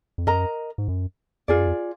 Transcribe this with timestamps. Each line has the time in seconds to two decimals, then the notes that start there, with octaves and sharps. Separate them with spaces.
0.18 F2
0.27 F#2 A#4 D#5 A#5
0.78 G#2
0.88 F#2
1.48 F2 F4 G#4 D5
1.58 F#2
1.68 F2